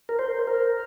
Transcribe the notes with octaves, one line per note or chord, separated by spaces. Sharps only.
A#4
C5
A#4